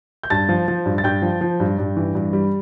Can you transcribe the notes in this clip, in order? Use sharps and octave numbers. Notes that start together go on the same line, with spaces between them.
G6
G2 A5 A6
F3
F3
G2
A6
G2 G5 G6
F3
F3
G2
G2
E3
G2
G3